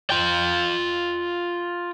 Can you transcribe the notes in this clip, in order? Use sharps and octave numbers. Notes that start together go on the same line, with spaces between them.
F4 G5